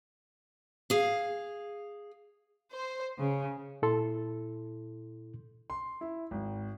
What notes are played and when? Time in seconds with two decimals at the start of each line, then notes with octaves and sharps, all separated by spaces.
0.90 G#4 F5
2.72 C5
3.18 C#3
3.82 A#2 E4 A4 C6
5.70 C6
6.01 E4
6.31 G#1